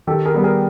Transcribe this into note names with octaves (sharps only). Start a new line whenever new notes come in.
D#3 G4 A4
G#4 A#4
G3 B3
G#4 A#4